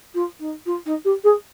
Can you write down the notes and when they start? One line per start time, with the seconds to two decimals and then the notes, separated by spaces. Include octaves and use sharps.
0.14 F4
0.39 D#4
0.65 F4
0.85 D#4
1.04 G4
1.23 G#4